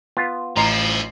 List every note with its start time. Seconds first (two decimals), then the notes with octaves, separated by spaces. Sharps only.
0.17 B3 F4
0.57 A1 F3 E4 D#5 A#5 C7